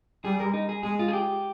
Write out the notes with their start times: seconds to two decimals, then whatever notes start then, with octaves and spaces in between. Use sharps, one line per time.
0.25 G3 G#4
0.40 A#4
0.54 D#4
0.69 G#4
0.83 G#3 G#4
0.99 F4
1.08 G#4
1.13 G4